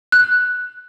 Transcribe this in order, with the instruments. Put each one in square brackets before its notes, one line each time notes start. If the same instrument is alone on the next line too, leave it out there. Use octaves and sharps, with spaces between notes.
[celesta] F#6